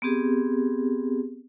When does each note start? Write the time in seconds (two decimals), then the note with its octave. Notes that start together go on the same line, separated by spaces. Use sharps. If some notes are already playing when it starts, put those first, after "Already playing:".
0.02 B3 C4 G4 G#4